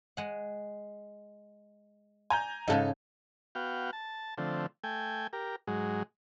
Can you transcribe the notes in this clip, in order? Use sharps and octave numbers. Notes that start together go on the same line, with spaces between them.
G#3 F#5
G#5 A#5 G6
G#2 C#3 G#3 D#4 A4 A5
B3 F#4 F5 G5
A5
D3 F3 A3 C4
A3 G5 G#5
G4 A#4
G#2 F#3 G#3